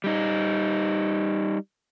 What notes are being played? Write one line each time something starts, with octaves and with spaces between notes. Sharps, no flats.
G3 D#4